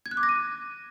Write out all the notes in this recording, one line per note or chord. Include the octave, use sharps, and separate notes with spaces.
G#6
F#6
D6
A#6
D#7